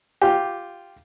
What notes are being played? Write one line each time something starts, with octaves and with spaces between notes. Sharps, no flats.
F4 G4